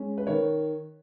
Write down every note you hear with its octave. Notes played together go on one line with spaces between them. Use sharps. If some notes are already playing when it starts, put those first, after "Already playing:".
Already playing: G#3 C#4
B4
D#3 C#5